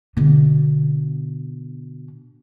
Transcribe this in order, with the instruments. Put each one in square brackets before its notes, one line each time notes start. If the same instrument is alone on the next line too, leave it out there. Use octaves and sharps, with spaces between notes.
[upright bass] B2 D3